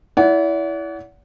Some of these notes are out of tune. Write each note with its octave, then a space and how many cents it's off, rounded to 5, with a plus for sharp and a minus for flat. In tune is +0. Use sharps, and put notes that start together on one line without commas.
E4 +0 D5 -45 F#5 +0